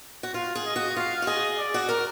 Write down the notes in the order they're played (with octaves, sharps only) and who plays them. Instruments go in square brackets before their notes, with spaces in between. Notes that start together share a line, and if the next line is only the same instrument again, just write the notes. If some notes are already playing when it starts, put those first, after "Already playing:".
[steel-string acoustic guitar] F#4
[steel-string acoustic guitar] F4 [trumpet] F5
[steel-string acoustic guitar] G#4
[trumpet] D#5
[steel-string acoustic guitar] F#4
[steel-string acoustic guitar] F4 [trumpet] F5
[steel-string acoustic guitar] F#4
[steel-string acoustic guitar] G#4 [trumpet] D#5
[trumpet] D5
[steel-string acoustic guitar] F#4
A#4